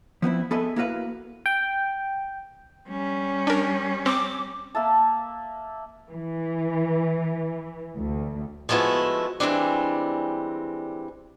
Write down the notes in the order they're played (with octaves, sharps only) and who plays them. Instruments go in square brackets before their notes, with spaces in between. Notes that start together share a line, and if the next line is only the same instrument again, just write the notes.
[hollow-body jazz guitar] F3 B3 C4 E4
B3 G#4 A4 B4 D#5 E5
A#3 E4 F#4 A#4 B4 F5
[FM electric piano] G5
[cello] G3 C#4
[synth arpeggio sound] D4 A#4
[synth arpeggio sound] C4 [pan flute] D6
[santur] A#3 E5 A5
[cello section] E3
D2
[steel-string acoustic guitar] F3 G#3 A3 B3 E4 F#4
E3 F3 G3 G#3 C4 D4